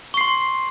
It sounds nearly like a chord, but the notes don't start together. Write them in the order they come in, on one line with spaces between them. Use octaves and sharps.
C#6 C7 C6